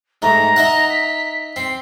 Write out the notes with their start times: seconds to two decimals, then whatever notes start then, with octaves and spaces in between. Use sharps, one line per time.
0.22 G#2 A3 A#5
0.56 D#4 E5 F#5
0.89 B6
1.56 C4 C7